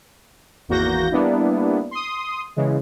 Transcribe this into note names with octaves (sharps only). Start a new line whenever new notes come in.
G#1 E2 A#3 F#4 G6 A#6
G3 A#3 B3 D4 E4
C6 D#6
C#3 E3 G#3